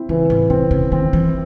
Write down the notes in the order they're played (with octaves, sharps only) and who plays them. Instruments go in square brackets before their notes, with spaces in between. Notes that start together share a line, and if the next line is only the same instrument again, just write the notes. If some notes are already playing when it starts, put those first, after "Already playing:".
Already playing: [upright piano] C4 E4
[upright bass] C#3 [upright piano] E3
[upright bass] A2
[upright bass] C3 [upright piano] C4
[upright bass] C#3
[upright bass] D#3 [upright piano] C4
[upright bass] E3